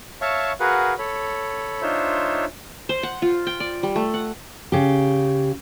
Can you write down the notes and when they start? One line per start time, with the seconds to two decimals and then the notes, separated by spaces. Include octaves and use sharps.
0.21 C#5 E5 F5 A5 C#6
0.60 F#4 G#4 A#4 B4 F5 F#5
0.98 A4 C#5 B5
1.82 D4 D#4 F4 C5 C#5 E5
2.89 C5
3.03 F#5
3.22 F4
3.47 G5
3.60 D5
3.83 G3
3.96 A3
4.14 F#5
4.72 C#3 G4